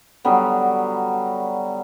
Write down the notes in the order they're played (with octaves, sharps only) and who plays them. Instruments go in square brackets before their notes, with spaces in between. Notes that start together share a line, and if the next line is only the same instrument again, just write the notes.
[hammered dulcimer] D3 F#3 G3 B3